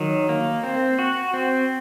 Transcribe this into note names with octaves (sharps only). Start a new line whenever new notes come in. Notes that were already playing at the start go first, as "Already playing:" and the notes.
Already playing: D#3 F#3
A#3
C4
F#4
C4